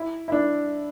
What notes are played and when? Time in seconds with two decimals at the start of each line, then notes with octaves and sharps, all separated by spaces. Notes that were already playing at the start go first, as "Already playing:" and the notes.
Already playing: E4
0.28 E4
0.32 D4